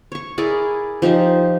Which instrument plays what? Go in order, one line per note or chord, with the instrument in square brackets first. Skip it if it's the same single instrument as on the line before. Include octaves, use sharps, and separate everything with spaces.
[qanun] C#5 C#6
E4 G#4 A#4 D5
F3 D#4 G4 C5